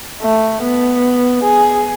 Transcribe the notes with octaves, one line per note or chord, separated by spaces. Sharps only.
A3
B3
G#4